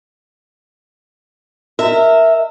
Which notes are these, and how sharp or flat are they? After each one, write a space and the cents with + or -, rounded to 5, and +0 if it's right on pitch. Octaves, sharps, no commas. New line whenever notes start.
A#4 +0 E5 -5 A#5 -40